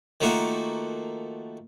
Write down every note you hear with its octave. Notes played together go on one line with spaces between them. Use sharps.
D#3 F3 A3 A#3 F#4